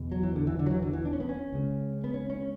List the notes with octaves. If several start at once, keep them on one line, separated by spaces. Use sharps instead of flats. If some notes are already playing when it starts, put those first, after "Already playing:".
Already playing: E2 B2
F#3
E3
D3
E3
D3
F#3
E3
D3
E3
D4
C#4
B3
C#4
C#2 C#3
B3
C#4
C#4